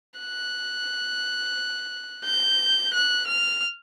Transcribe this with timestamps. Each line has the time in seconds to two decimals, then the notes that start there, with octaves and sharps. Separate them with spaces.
0.20 F#6
2.25 G6
2.94 F#6
3.27 F6